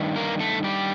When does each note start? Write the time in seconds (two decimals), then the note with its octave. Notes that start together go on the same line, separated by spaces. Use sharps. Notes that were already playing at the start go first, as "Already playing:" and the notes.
Already playing: G2 D#3
0.16 A#3 A#4
0.40 A3 A4
0.64 G3 G4